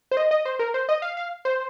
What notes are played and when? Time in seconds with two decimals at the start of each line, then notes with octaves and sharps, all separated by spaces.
0.11 C5
0.17 D#5
0.31 D#5
0.45 C5
0.59 A#4
0.74 C5
0.89 D#5
1.02 F5
1.17 F5
1.45 C5